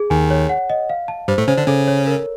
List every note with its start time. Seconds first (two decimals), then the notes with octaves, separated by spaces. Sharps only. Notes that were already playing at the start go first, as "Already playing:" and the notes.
Already playing: G#4
0.10 D#2 D#3 G#5
0.30 C#5
0.49 F#5
0.70 D#5
0.90 F5
1.08 A5
1.28 G2 G3 C5
1.38 A2 A3
1.48 C#3 C#4 C5
1.58 D3 D4
1.67 C#3 C#4 A4
1.88 C#5
2.07 A#4